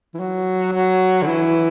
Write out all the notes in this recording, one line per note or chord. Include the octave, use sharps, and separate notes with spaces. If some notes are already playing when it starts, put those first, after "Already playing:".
E3
F#3
F#3
D3
E3